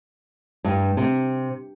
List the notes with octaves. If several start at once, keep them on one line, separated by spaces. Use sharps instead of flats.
G2
C3